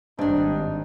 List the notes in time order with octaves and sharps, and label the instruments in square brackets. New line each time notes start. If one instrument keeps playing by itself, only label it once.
[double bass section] G#1 [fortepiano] G2 [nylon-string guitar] C4 D4 [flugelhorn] D#4